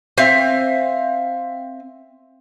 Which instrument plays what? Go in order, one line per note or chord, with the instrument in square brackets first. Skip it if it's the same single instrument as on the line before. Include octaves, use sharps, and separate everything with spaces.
[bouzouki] C4 E5 F5